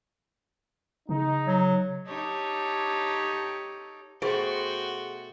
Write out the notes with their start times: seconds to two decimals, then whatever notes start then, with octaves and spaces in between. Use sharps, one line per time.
1.09 C#3 D#4
1.47 F#3
2.07 D#4 G4 A4 C#5
4.22 B2 A3 F#4 G#4 C5 G5 D7